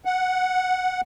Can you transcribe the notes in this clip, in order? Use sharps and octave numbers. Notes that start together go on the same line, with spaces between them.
F#5